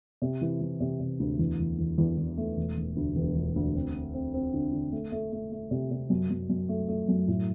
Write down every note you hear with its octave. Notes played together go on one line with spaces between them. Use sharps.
C3
E3
E3
C3
C3
D2
E2
E2
E2
E2
E2
A3
E1
E1
D2
E1
E1
D2
C4
C4
C4
C4
D3
D3
A3
A3
A3
A3
C3
C3
F#2
F#2
F#2
A3
A3
F#2
A2